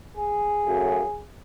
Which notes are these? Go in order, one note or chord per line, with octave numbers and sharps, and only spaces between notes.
G#4
F#2 C#3 F#3 A3